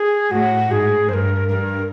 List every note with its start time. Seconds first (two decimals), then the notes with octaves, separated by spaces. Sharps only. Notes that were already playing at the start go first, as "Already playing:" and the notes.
Already playing: G#4
0.31 A2 F#4
0.71 G#2 G#4
1.09 G2 A#4 C5
1.48 G2 A#4